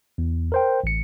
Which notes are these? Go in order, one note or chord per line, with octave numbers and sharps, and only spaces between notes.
E2
A#4 C5 G5
A1 C#7